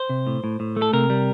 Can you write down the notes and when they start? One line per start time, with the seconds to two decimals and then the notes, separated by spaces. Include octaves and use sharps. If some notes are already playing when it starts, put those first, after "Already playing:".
Already playing: C5
0.10 C3
0.27 A2
0.44 A2
0.60 A2
0.77 A3
0.82 A4
0.93 C3 A#4
1.10 G3